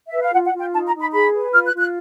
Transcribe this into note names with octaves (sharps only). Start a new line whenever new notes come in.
B4 E5
F5
F4 F#5
F#5
F4
G5
D#4 A5
A#5
D#4
B5
G#4 B5
B4
F4 F6
F#6
F4
F#6